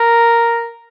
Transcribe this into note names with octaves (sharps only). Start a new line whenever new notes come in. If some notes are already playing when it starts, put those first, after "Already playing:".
Already playing: A#4